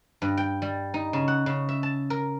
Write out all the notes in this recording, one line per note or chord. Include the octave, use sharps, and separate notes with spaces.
G2
G5
G3
D#4
C#3
F#5
C#3
E5
A5
A#4